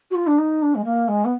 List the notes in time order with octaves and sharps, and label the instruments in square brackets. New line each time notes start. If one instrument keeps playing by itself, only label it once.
[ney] F#4
F4
D4
D#4
D4
G#3
A#3
G#3
B3